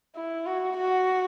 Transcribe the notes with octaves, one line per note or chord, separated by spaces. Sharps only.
E4
F#4
F#4